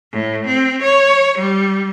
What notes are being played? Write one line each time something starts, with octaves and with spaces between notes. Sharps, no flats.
A2
C4
C#5
G3